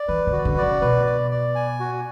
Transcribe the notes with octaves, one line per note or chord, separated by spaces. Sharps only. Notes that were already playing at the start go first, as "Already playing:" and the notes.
Already playing: D5
E3 B4
D3
F#4
D3
D5
C#3
B2 B4
D5
D5
G#5
F#4